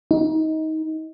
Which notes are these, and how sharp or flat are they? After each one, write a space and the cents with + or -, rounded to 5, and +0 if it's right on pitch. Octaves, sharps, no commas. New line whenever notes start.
D#4 +25